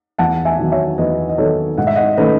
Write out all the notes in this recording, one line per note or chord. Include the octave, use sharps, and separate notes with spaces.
E2 F#5 A5
E5 G#5
D#3 F#3 B3
C#5 E5
E2 B4 D#5
D#5
D#3 F#3 B3 A4 C#5
G#2 F#5
E5
D#5 F#5
D#3 A3 C#4 B4 D#5